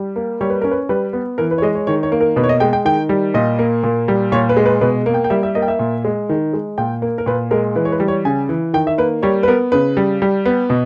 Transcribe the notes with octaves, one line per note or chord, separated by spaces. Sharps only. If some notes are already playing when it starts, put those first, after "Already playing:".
Already playing: G3
A#3
G3 C#5
B4
C#4 A#4
B4
G3 B4
B3
E3 A#4
B4
C#5
G#3 D#5
C#5
D#3 C#5
C#5
A#3
A#4
B2 B4
C#5
D#5
G#3 G5
G5
D#3 G5
G3
A#2 D#5
A#3
A#2
G3
A#2 C#5
B4
G#3
B4
B2 B4
A#3
G5
G5
G3 E5
E5
A#3 D#5
G5
E5
A#2
G#3
D#3
G#3
A#2 G5
A#3
A#4
A#2 B4
G#3 A#4
E3 B4
C#5
B4
G3
C#5
C#3 G#5
E3
D#3 G5
E5
A#3 B4
G3 C#5
B4
B3 A#4
C#3 B4
G3
G3
B3
B2